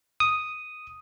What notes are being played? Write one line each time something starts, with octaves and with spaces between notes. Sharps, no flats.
D#6